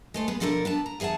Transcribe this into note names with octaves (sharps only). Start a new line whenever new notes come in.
G#3 A3 C5
B3 G#4
B2 F3 D4 A4 A#4
B3 D4 A5
A#5
E2 G#4 C#5 F#5 A5